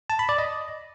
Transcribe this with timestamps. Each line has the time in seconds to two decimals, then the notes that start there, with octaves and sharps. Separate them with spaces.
0.10 A5
0.19 B5
0.29 D5
0.38 D#5